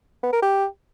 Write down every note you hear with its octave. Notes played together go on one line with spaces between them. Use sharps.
B3
A#4
G4